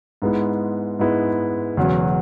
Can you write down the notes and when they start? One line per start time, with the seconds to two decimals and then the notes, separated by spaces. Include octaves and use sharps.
0.22 G#2 G#3 B3 E4
0.99 G#2 G#3 B3 E4
1.77 E1 E2 C#3 F#3 C#4